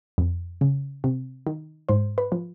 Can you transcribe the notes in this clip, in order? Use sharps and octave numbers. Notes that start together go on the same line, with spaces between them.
F2
C#3
C3
D#3
G#2 C5
B4
F3